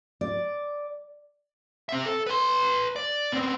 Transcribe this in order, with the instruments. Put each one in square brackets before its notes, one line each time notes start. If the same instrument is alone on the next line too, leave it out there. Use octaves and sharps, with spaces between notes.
[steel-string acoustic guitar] D5
[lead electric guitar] C4 E5
A4
B4 C6
D5
B3 C4